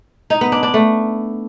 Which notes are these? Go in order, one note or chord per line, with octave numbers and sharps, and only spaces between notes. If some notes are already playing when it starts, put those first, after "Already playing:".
D#4
B3
D4
D4
A3